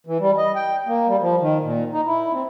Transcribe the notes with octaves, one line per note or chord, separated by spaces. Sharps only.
E3
G3
D#5
G5
A#3
G3
F3
D#3
A#2
D#4
E4
C4